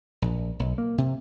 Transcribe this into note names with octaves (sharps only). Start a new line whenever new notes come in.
A#1
B1
A#3
C3